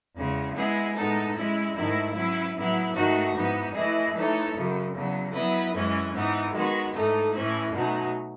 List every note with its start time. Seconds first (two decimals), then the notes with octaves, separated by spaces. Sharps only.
0.15 E2 C#3 G#3
0.55 G#3 B3 E4 G#4
0.95 A2 G#3 B3 D#4 A4
1.35 G#3 C#4 E4
1.75 G#2 D#3 A3 E4
2.14 F#3 C#4 E4 B4
2.54 A2 F#3 B3 E4
2.94 G#2 D#3 A3 D#4 F#4
3.34 G#2 E3 B3 D#4
3.74 E3 A3 E4 G#4 D#5
4.14 E3 A3 D#4 A4 C#5
4.53 F#2 C#3 F#3
4.94 E2 C#3 F#3
5.33 F#3 B3 E4 B4 D#5
5.73 F#2 E3 G#3 C#4
6.13 G#2 E3 B3 D#4
6.53 D#3 G#3 B3 F#4
6.93 G#2 E3 A3 D#4 A4
7.32 A2 E3 A3 C#4 E4
7.72 B2 F#3 A3 D#4